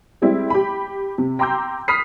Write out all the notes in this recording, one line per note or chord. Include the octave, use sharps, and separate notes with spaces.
G3 G#3 C4 E4
G4 B5
C3
G5 A#5 C6 D6 E6 G6
B5 D#6 F6 B6 C7